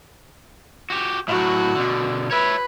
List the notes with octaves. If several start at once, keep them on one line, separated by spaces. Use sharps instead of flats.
F#4 G4
A2 F#3 F#4
B2 D3
B4 C#5 E5